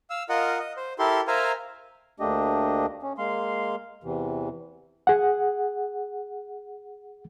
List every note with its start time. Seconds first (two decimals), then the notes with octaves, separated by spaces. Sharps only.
0.10 F5 E6
0.29 F4 A#4 D#5 F#5
0.59 D#5
0.77 C5
0.99 E4 G4 A4 A#4 C6
1.27 A#4 C5 E5 F5 G#5 A#5
2.20 D2 A3 A#3 D4 G4 D#5
3.03 C#4
3.18 G#3 A#3 F5 C6
4.04 E2 C3 E3
5.07 G#4 F#5